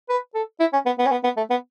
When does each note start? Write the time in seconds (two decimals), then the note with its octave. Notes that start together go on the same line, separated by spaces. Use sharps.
0.09 B4
0.34 A4
0.60 E4
0.73 C#4
0.86 B3
0.99 B3
1.06 C#4
1.11 B3
1.24 B3
1.37 A3
1.50 B3